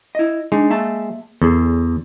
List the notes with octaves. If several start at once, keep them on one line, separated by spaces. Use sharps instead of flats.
E4 D#5
G#3 D4 D#4
A#3 E5 A5
E2 G#4 A4